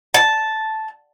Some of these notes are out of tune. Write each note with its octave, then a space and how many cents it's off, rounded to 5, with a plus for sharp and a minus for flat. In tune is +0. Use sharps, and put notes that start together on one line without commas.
A5 -5